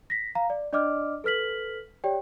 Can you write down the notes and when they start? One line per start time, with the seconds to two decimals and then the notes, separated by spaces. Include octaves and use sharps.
0.10 A#6 B6
0.35 F5 A#5
0.50 D5
0.73 D4 D5 D#5 D6 F6
1.24 A4 B4 F6 B6 F#7
2.04 G4 C#5 D5 G5